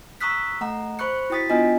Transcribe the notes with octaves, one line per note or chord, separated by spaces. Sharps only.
A#5 C#6 D#6 E6 F#6 B6
A3 F#5 A#5
C5 B5 C#6 F#6 C#7
E4 F#4 G5 D#6 A6 B6
B3 D4 F4 D#5 G#5